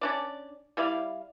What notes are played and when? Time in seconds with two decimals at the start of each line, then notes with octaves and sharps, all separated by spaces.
0.01 C#4 D4 D5
0.77 G3 E4 D5 F5